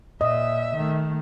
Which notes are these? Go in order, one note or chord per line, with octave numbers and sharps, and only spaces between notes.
A#2 D#5 E5
D#3 A3